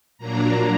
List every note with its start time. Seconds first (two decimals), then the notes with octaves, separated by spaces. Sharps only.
0.18 A#2 F#3 A#3 D4 A#5